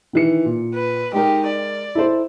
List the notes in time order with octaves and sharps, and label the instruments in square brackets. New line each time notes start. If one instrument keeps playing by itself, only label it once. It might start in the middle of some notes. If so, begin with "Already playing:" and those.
[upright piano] D#3 E3 C#7
A#2
[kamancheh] B4
[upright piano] G#3 A#4 [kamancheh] D#4 G4
[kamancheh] D5
[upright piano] E4 A4 C5